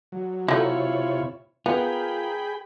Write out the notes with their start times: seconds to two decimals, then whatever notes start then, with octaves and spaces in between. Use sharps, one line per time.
0.12 F#3
0.48 C3 F#3 A3 E4 F4 C#5
1.66 B3 F4 G#4 A#4 G5 B5